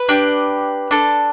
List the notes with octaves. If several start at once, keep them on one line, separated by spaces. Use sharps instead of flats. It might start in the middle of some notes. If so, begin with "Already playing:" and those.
Already playing: B4
D4 G4
D4 A4